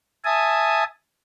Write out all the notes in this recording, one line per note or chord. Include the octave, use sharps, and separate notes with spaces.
E5 G#5 A5 D#6